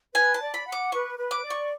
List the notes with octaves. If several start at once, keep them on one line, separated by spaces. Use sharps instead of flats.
B4 G#5
A5
D5
B5
F#5
D6
B4 C#6
B4
D6
D5
C#6